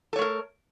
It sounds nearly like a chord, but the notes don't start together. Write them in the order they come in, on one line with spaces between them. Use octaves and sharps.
A4 C#5 A3 A#4